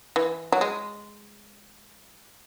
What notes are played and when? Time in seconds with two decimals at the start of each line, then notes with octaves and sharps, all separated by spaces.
0.16 E3
0.52 F#3
0.61 G#3